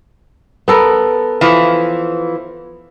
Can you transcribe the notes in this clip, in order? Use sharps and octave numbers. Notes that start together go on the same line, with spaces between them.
B3 A4 A#4
E3 F3